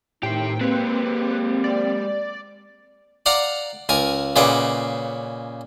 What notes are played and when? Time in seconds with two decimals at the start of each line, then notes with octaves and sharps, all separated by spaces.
0.23 A2 D3 D#3 D#4 G4 C5 G5
0.61 G#3 A#3 C4 G4 B4
1.64 D5
3.26 D5 F5 F#5 A#5
3.89 C#2 A#4 G#5
4.36 A#2 C#3 G#3 B4 F#5 D6